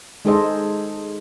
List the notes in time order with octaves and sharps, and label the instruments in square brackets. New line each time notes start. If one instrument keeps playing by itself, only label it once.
[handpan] G#3 D#4 G#4 A4 C5 D#5